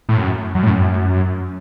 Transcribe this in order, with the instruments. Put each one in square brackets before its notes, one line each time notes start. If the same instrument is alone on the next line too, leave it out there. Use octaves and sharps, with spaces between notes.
[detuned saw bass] A2
F#2
F#2
A2
F#2